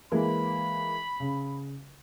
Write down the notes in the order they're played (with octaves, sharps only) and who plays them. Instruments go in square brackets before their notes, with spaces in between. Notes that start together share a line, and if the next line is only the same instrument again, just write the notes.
[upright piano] E3 G#3 A#3 [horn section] B5
[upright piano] C#3